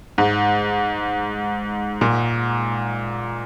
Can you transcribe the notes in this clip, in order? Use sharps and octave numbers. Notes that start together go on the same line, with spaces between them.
G#2
A#2